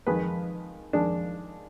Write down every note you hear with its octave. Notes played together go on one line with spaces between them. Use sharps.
F2 D#3 G#3 B4
F2 D#3 G#3 D4